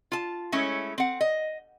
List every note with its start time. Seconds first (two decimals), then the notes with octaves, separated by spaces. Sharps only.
0.12 F4 A5
0.52 G#3 A3 C#4 E4 C#5
0.98 C4 F#5
1.21 D#5